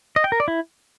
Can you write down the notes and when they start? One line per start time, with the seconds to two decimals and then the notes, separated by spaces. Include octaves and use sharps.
0.16 D#5
0.24 G5
0.32 A#4
0.40 D5
0.48 E4